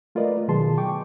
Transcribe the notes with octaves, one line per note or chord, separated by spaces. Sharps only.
A3 F4 A#4 B4 D5 D#5
B2 D#3 F#3 G#4 A5 C6
G5 C#6 D6